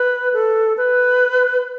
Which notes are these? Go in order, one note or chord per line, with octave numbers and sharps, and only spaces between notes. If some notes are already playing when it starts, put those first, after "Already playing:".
Already playing: B4
A4
B4